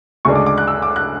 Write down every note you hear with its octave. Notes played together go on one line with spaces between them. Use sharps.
D2 C#3 G#3 D4 C#6
D6
D6
F#6
E6
D6
F#6